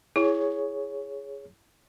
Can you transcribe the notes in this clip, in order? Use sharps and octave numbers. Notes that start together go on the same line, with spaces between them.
E4 G#4 C#5